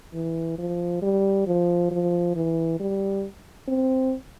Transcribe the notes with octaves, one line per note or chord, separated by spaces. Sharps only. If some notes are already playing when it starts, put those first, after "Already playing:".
E3
F3
G3
F3
F3
E3
G3
C4